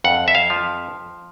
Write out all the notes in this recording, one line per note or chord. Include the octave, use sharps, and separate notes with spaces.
F2 F#5
E5
F5
F3